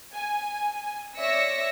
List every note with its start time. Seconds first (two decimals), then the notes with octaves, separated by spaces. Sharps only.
0.14 G#5
1.17 C#5 D5 E5 E6 A#6 C#7